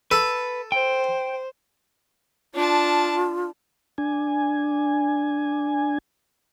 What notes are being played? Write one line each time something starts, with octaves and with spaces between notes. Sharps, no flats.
A4 B4
C5 G5
D4 F4 A5
D4 G#5